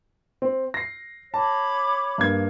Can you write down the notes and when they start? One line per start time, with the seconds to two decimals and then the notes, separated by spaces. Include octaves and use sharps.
0.42 C4
0.74 A#6 C7
1.34 C#5 A5 B5 D6
2.18 G2 A#3 G#6